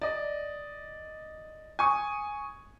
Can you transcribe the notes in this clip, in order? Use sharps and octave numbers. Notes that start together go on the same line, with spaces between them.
D5 D#5
G#5 C#6 D#6